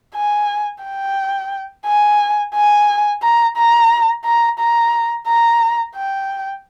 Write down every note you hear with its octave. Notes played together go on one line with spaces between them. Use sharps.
G#5
G5
G#5
G#5
A#5
A#5
A#5
A#5
A#5
G5